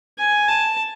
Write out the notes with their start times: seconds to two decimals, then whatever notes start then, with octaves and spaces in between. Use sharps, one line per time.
0.19 G#5
0.48 A5